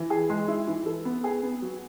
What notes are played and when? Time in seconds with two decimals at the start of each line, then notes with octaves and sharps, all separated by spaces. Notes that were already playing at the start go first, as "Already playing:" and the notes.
Already playing: E3
0.10 G#4
0.30 G#3
0.48 E4
0.67 E3
0.86 A4
1.05 B3
1.24 G#4
1.43 B3
1.62 F#3